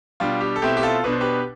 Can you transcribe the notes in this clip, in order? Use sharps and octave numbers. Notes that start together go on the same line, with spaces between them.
B2 G3 D4 F4
G4
A4
B2 A3 C4 E4 G4
G4
F4 A4
B2 B3 D4 B4
C5
G4 B4